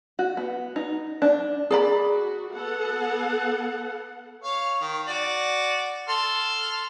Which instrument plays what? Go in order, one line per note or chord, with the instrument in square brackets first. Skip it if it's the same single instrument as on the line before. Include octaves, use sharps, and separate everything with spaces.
[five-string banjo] F#4
B3
D#4
D4
[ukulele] G#4 D5 B5
[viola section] F#4
B3 A4 F#5
[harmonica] C#5 F5
D#3
F#4 D5
A4 C6 F6